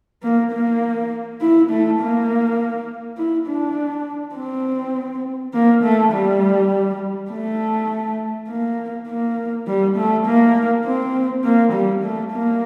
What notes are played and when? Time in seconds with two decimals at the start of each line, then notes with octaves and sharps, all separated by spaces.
0.23 A#3
0.51 A#3
1.41 E4
1.70 A3
2.00 A#3
3.17 E4
3.46 D4
4.35 C4
5.53 A#3
5.83 A3
6.12 G3
7.31 A3
8.49 A#3
9.08 A#3
9.67 G3
9.96 A3
10.26 A#3
10.85 C4
11.44 A#3
11.72 G3
12.02 A3
12.32 A#3